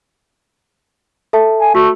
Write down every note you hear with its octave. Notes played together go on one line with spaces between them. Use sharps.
A4 E5 A5
G#5
A3 F#4